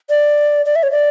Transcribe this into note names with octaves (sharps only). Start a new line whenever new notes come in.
D5
D5
E5
C#5
D5